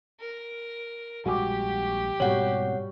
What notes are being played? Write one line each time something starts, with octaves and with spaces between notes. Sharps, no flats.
A#4
A#1 G3 G#3 F#4 G4 G#5 D6
G#2 B2 G3 C4 F#4 C#5 F#5 F#7